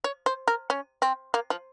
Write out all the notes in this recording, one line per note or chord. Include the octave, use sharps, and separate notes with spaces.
C#5
C5
A#4
C#4
C4
A#3
F3